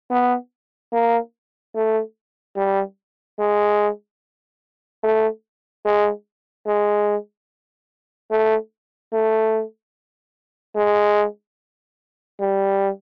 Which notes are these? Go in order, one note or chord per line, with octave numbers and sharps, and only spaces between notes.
B3
A#3
A3
G3
G#3
A3
G#3
G#3
A3
A3
G#3
G3